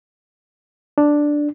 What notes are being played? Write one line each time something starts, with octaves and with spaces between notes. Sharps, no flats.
D4